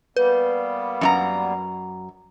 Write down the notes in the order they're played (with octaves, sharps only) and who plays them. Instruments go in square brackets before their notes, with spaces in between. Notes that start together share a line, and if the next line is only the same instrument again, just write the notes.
[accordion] G3 A#3 B3 [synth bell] B4
[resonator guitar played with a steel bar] F#2 F4 A#5